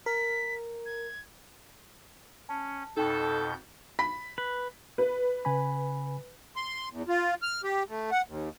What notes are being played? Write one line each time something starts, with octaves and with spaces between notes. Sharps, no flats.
A#4 B6
G#6
C#4 A5
F2 B2 D#4 A4 G5 G6
B5 B6
B4
B4
C#3 G#5 B5
C6
E2
F4
F6
G4
A3
F#5
D#2